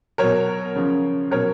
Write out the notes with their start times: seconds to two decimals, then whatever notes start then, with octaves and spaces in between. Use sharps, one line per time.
0.18 B2 F#3 A#4 C#5
0.76 C#3 F3
1.31 B2 F#3 A#4 C#5